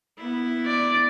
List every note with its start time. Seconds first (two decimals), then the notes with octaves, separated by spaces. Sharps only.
0.17 B3 E4
0.66 D5